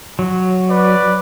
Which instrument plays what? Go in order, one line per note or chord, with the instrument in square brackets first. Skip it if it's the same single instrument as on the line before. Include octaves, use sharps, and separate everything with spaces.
[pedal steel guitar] F#3
[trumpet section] B4 D5